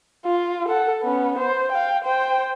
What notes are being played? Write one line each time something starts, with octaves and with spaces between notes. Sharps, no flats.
F4
A4 F#5
B3 C#4
C5
F5 G5
C5 G5